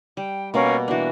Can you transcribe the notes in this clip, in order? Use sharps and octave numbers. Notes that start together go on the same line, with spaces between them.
G3 G5
B2 A#3 C#4 A#4 D5 F5
E3 D4 F#4